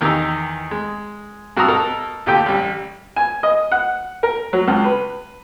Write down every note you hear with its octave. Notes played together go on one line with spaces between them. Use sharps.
E2 D#3 D#4 G4 A#5 E6
G#3
G2 F#4 A5 A#5 D#6 E6
B2 A4 A#4 A#5
D2 A#2 G4 A4 G5
A1 G3
G#5
D#5
F#5
A#4
F#3
C#2
B4